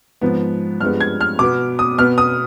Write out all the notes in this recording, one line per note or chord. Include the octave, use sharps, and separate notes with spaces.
G#2 F3 B3
G2 F3 G#3 B3 F6
G#6
F6
B2 B3 D6
D#6
B2 B3 F6
D#6